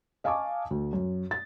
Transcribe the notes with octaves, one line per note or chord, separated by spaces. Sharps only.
D#5 F5 G#5 A5 C#6 D6
D2
F#2
A6